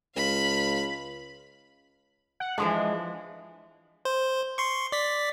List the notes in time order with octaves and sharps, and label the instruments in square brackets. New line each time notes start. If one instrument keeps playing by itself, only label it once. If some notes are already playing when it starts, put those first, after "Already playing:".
[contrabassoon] C#2 [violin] F5 B5
[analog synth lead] F#5
[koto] E3 F3 D4 [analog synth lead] G#3
[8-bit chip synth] C5
C6 C#6
D5 B6